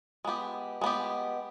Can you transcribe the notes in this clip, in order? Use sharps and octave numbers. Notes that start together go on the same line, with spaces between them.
G#3 B3 G4
G#3 B3 G4